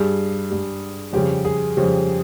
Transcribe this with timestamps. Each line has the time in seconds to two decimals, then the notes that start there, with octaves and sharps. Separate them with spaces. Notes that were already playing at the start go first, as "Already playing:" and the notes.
Already playing: G2 G3 G#4
0.50 G2 G3
1.13 F2 C#3 G3 G4
1.45 G#4
1.77 F2 C#3 G3